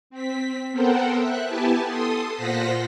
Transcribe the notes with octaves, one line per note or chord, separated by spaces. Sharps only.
C4 B6
B3 A4 A#4 C5 F#5 G5
E5 F#6
B3 E4 G4 G#5 A5
A4 C6 D#6
A#2 F4 C5 F#5 A#6 B6